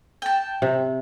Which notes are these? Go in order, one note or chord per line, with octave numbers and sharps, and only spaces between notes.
G5 A5
C3